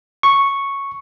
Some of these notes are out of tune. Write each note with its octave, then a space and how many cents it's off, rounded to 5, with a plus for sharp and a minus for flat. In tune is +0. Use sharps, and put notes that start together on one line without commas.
C#6 -5